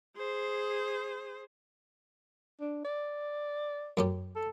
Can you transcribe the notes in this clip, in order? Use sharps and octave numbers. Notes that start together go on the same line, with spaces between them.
G#4 C5
D4
D5
F#2 C#4 G4
A4